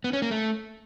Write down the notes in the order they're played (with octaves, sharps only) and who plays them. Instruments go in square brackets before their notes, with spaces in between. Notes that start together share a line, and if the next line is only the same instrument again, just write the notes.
[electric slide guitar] B3
C#4
A#3
A3